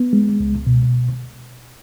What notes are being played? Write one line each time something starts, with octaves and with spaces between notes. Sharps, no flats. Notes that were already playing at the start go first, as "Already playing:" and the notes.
Already playing: B3
G#3
C#2
B2